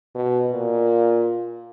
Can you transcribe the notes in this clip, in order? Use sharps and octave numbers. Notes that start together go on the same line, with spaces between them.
B2
A#2